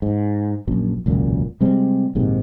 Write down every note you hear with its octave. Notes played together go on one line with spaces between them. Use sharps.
G#2
A#1 F#2
E1 C#2 F#2 A#2
C3 G3 G#3 C4
A#1 G#2 C3 D#3